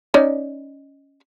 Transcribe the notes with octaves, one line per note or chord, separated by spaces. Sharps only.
C#4 D#4 D5